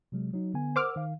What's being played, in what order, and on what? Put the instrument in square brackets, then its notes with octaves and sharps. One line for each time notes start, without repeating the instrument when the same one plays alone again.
[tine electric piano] C3 F#3 G#3
F#3 D#4
D3 B3 G#5
[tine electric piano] A#4 F#5 E6 [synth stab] C5 D6 F6
[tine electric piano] D#3 F5